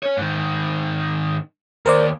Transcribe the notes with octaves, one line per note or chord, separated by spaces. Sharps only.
C#4 C#5
G#2 D#3
D#2 A#4 C5 D5